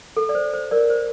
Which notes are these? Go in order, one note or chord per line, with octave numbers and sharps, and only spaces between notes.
A4
D5
C5
C5
A#4 D5
C5